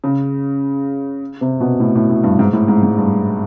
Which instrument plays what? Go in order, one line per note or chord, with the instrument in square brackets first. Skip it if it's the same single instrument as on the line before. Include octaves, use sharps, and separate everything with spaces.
[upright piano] C#3
C3
B2
A2
A2
A2
G2
G#2
A2
G#2
G#2
G2